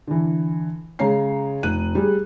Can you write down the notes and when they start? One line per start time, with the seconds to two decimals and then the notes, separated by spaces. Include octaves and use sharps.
0.07 D3 E3
0.99 C#3 G#3 C#5 A#5 C7
1.63 F1 F#6 D#7
1.95 G3 G#4